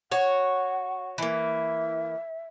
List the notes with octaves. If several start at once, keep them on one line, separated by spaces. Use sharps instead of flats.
F#4 C#5 F#5
E3 A#3 E5